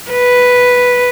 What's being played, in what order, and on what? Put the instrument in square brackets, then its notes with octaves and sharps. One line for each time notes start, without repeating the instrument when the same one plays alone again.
[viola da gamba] B4